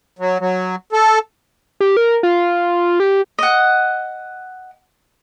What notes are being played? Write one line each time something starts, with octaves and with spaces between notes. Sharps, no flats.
F#3
F#3
A4
G4
A#4
F4
G4
D#5 F#5